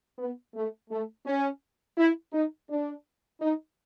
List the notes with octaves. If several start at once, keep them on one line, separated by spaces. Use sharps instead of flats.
B3
A3
A3
C#4
E4
D#4
D4
D#4